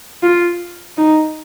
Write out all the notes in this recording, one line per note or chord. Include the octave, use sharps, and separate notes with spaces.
F4
D#4